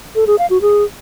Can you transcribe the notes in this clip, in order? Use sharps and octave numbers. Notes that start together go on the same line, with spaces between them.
A4
G#4
F5
F#4
G#4